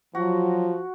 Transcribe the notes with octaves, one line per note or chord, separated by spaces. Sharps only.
F3 F#3 F4 F#4